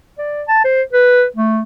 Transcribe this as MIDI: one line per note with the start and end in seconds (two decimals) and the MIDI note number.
0.18 0.43 74
0.48 0.60 81
0.64 0.82 72
0.93 1.25 71
1.36 1.63 57